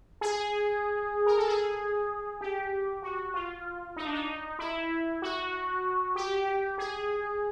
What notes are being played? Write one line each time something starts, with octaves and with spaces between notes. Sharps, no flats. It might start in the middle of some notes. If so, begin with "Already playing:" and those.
G#4
A#4
A4
G#4
G4
F#4
F4
D#4
D4
D#4
E4
F#4
G4
G#4